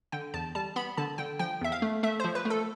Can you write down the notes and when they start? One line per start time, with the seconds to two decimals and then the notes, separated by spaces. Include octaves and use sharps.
0.12 D3 G5
0.34 E2 A5
0.55 G3 A5
0.76 B3 B5
0.97 D3 A5
1.18 D3 G5
1.39 F3 G5
1.61 E2 E5
1.72 F5
1.82 A3
2.03 A3 E5
2.20 F3 C5
2.35 B4
2.45 A3
2.50 A4